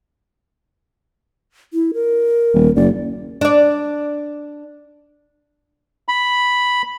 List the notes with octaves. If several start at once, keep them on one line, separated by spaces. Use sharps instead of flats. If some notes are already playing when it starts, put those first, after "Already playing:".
E4
A#4
D#1
F#1 D5
D4 D5
B5